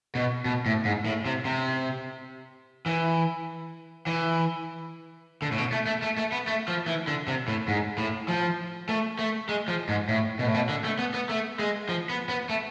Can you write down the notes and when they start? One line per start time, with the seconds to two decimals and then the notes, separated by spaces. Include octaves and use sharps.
0.15 B2
0.45 B2
0.66 A2
0.85 G#2
1.06 A2
1.26 C3
1.45 C3
2.86 E3
4.07 E3
5.42 D3
5.52 A2
5.58 B2
5.72 A3
5.87 A3
6.02 A3
6.17 A3
6.32 B3
6.48 A3
6.68 F3
6.87 E3
7.08 D3
7.28 C3
7.48 A2
7.68 G#2
7.98 A2
8.28 F3
8.89 A3
9.19 A3
9.49 G#3
9.68 F3
9.89 G#2
10.09 A2
10.39 B2
10.46 A2
10.54 B2
10.69 D3
10.84 A3
10.99 B3
11.14 B3
11.29 A3
11.59 G#3
11.89 F3
12.09 B3
12.29 B3
12.49 A3